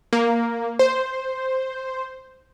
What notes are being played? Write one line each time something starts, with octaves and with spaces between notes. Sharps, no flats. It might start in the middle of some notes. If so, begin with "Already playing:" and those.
A#3
C5